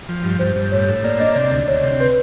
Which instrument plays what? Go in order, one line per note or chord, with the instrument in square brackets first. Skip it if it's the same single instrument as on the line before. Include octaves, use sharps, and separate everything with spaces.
[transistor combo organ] F3
G2
[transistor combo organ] G2 [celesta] C5
[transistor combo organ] G2
[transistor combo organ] A2 [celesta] C#5
[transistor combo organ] A2
[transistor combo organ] A#3 [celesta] D5
[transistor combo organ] D4 [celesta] D#5
[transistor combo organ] C3 [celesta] D5
[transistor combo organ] D2
[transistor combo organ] D2 [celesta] C#5
[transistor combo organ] C3
[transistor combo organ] C4 [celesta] B4